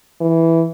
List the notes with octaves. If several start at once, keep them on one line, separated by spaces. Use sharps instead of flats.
E3